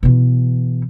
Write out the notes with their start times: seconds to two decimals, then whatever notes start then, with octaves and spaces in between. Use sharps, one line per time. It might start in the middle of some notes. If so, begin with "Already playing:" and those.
0.03 B2 E3